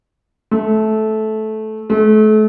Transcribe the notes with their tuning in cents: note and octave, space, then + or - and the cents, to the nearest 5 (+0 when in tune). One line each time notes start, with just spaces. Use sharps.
A3 -15
A3 -35